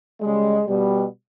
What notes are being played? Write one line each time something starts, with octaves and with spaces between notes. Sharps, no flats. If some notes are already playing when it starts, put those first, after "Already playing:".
C#3 G3 G#3
B2 G3